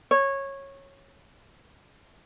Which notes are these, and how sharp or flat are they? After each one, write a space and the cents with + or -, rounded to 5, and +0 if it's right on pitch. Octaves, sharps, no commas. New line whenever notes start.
C#5 -15